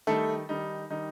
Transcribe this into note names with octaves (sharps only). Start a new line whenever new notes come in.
D#3 G3 A3 D#4 A4
D#3 G3 D#4
D#3 G3 D#4